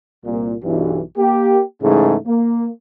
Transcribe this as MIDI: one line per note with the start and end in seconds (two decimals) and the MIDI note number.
0.25 0.53 36
0.25 0.53 46
0.63 1.00 35
0.63 1.00 43
0.63 1.00 52
1.17 1.60 58
1.17 1.60 67
1.82 2.15 44
1.82 2.15 49
1.82 2.15 52
1.82 2.15 56
1.82 2.15 57
1.82 2.15 63
2.26 2.67 58